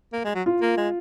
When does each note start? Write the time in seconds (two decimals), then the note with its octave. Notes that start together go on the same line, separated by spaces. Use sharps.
0.13 A#3
0.25 G#3
0.35 F#3
0.46 F4
0.62 A#3
0.78 G#3